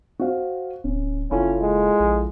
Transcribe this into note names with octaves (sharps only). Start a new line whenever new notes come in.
F#4 C5 F5
D1 C#4
F#1 C#4 E4 F4 A4
G#3
A#1